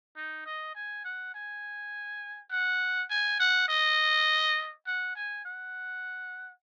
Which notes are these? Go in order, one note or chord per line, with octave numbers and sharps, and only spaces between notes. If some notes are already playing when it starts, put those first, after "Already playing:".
D#4
D#5
G#5
F#5
G#5
F#5
G#5
F#5
D#5
F#5
G#5
F#5